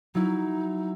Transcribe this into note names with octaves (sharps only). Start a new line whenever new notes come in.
F#3 D#4 E4